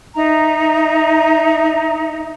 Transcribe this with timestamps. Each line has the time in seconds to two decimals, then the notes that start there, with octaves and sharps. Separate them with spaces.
0.16 D#4 E5 A#5